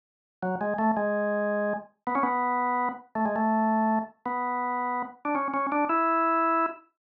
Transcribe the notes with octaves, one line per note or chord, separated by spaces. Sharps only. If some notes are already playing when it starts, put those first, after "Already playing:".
F#3
G#3
A3
G#3
B3
C#4
B3
A3
G#3
A3
B3
D4
C#4
C#4
D4
E4